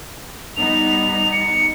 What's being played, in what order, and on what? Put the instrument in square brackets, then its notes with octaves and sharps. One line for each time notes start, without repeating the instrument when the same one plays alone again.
[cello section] G3 B3 D#4 [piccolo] F7
[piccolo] C#7